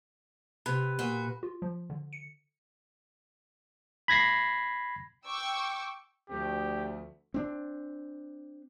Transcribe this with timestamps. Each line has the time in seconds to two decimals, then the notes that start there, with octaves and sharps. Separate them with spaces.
0.66 C3 B4
0.99 A#2 F#4
1.43 F4
1.62 F3
1.90 D3
2.13 C#7
4.08 B5 G#6 A#6 C7
5.25 G5 C#6 D6 E6
6.29 D2 F3 A3 C4 G4
7.34 C4 D4